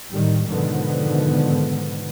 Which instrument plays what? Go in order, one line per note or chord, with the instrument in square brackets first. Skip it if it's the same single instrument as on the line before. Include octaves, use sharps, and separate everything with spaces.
[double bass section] A2 D#3 G3
G#2 B2 D3 D#3 F3 B3